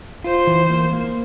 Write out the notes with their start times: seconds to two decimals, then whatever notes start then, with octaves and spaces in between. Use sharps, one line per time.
0.24 F4 C5
0.47 E3
0.70 A#3
0.93 A#3